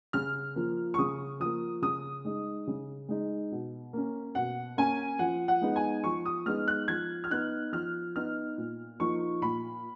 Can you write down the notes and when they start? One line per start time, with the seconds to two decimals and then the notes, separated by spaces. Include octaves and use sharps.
0.13 C#3 F6
0.56 F3 A#3
0.94 C#6
0.98 C#3 D#6
1.40 F3 A#3 D#6
1.82 C#3 D#6
2.25 G#3 D#4
2.67 C#3
3.08 G#3 D#4
3.52 B2
3.93 A#3 C#4
4.35 B2 F#5
4.77 A#3 C#4 G#5
5.19 F3 F#5
5.48 F#5
5.61 G#3 B3 D#4
5.76 G#5
6.04 F3 C#6
6.25 D#6
6.46 G#3 B3 D#4 F6
6.68 F#6
6.88 F3 G#6
7.24 F6
7.30 B3 D#4 F#6
7.72 F3 F6
8.16 B3 D#4 F6
8.58 A#2
8.99 F3 A#3 D#4 C#6
9.42 A#2 B5